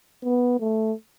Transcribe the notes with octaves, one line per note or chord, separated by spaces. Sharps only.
B3
A3